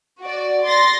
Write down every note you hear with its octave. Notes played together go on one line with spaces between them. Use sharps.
F#4 D5
C6 A6 A#6